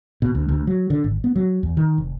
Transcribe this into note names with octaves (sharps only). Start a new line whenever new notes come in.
B2
D2
D2
F#3
D3
G#1
B3
F#3
E2
D#3
F1